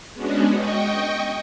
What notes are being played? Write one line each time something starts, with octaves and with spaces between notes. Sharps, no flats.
G#3 B3 C#4 D4 F#4
D#5 G5 C#6